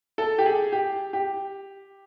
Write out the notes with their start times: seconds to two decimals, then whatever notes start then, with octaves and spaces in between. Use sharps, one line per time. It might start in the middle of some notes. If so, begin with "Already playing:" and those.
0.18 A4
0.38 G4
0.46 G#4
0.72 G4
1.13 G4